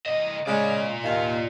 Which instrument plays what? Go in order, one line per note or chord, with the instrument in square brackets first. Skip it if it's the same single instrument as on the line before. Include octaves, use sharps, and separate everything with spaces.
[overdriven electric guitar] D3 D#5
[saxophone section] C#3 G#3 [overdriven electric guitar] F4 D5
[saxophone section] D#2 D#3 F5